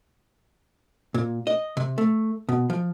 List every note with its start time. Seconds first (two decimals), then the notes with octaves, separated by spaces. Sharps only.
1.14 A#2
1.47 D#5
1.77 C3
1.98 A3
2.49 B2
2.70 F3